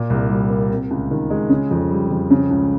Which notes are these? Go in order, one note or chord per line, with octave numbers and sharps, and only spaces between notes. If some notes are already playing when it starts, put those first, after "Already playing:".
Already playing: A#2
C2
G3
A#3
C3
C#2
D#3
G#3
C#3
F2
G3
F2
C#3
C#2